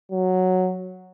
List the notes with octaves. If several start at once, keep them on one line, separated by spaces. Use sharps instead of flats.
F#3